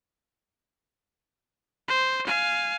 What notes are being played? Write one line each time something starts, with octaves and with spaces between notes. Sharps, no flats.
C5
F5 G#5